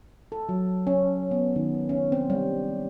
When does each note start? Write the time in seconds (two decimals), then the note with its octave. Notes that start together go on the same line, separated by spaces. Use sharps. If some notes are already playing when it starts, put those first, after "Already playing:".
0.32 A4
0.49 F#3
0.87 C#4
1.31 B3
1.56 D#3
1.89 C#4
2.12 C4
2.30 G3